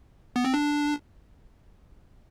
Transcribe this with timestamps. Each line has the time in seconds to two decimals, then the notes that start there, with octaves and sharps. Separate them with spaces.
0.36 B3
0.44 C4
0.54 D4